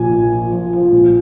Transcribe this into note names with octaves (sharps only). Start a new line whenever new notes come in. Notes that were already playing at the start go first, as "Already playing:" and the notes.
Already playing: A#1 A#2 G#5
A#2
A#2
F3
F3
A#1